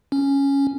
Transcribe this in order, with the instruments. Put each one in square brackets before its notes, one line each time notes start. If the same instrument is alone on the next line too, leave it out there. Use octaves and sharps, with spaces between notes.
[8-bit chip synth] C#4